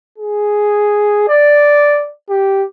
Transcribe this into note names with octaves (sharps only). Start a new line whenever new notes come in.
G#4
D5
G4